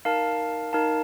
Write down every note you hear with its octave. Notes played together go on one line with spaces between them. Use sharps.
D#4 A#4 F5 A5
D#4 A#4 F5 A5